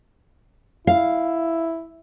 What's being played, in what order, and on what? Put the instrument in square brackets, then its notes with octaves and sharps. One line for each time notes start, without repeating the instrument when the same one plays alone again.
[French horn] E4 [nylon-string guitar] F5